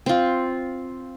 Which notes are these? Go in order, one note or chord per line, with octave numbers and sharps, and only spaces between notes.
C4 F4